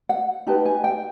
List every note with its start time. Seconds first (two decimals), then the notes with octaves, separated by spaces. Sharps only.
0.09 F#5
0.47 D#4 G4 B4 A5
0.65 G#5
0.84 G5